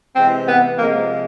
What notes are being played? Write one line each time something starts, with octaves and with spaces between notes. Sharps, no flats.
C3 E3 G#3 C4
B3
C3 F3 G#3 A#3